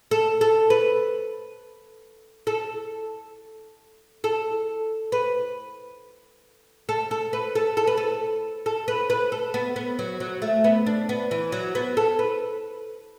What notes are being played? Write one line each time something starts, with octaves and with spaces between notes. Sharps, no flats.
A4
A4
B4
A4
A4
B4
A4
A4
B4
A4
A4
B4
A4
A4
B4
B4
A4
B3
B3
F#3
F#3
A3
B3
D4
B3
E3
F#3
B3
A4
B4